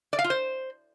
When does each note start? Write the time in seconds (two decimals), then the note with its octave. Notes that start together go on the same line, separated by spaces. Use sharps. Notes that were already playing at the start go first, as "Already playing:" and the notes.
0.13 D5
0.19 F5
0.24 F4
0.30 C5